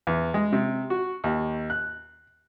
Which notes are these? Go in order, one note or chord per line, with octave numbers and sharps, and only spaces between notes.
E2
G#3
C3
F#4
D#2
F#6